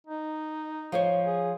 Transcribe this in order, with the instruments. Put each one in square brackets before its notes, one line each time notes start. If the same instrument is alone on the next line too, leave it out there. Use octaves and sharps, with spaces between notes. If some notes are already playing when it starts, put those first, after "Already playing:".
[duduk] D#4
[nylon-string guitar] F3 C5 C#5
[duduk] G#4